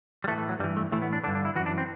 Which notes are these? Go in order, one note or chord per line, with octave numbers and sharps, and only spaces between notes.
G3
A2 E3 A3
A3
F#3
G2 E3 G3
A3
A2 E3 A3
B3
D4
G2 D3 D4
D4
E4
F#2 E3 F#4
D4
C4